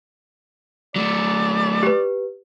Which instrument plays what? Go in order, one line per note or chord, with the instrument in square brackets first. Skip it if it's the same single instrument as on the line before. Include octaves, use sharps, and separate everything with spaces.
[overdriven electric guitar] F#3 A3 [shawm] D5
[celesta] G4 B4